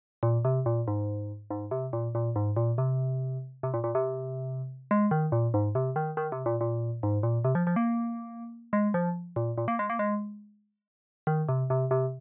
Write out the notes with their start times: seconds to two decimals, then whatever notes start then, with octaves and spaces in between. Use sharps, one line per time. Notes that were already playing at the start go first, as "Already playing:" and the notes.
0.23 A#2
0.45 C3
0.66 A#2
0.88 G#2
1.51 G#2
1.71 C3
1.93 A#2
2.15 A#2
2.36 G#2
2.56 A#2
2.78 C3
3.63 C3
3.74 A#2
3.84 A#2
3.95 C3
4.91 G#3
5.11 D#3
5.32 A#2
5.54 G#2
5.75 C3
5.96 D#3
6.17 D#3
6.32 C3
6.46 A#2
6.61 A#2
7.03 G#2
7.23 A#2
7.44 C3
7.55 F3
7.67 F3
7.76 A#3
8.73 G#3
8.94 F3
9.36 A#2
9.58 A#2
9.68 A#3
9.79 G#3
9.90 A#3
9.99 G#3
11.27 D#3
11.49 C3
11.70 C3
11.91 C3